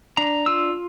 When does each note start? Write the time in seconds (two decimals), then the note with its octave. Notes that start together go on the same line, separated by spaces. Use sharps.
0.17 D4 A#5
0.46 F4 E6